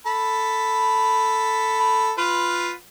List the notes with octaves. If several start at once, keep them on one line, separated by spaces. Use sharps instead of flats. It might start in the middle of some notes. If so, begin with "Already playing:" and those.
A4 B5
F4 B4